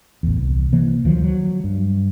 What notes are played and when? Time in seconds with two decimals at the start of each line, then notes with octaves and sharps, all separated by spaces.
0.23 A1 E2
0.38 C2
0.72 C3 E3 A#3
1.05 D2 D#3 F3 F#3
1.24 F#3
1.64 G2